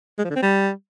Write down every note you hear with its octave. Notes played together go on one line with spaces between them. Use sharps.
G#3
F3
D3
C4
G3